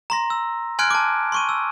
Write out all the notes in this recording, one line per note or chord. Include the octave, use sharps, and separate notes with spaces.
A#5 C6 A#6
E6
G#5 C6 F6 F#6 G#6 D7
A5 D6
C6 C#6 D#7
E6